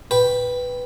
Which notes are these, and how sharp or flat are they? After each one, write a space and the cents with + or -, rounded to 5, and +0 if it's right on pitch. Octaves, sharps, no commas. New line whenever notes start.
B4 +0 G5 +0